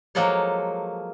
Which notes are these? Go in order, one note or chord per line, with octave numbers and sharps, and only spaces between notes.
F3 F#3 G#3 A#3 A4 C#5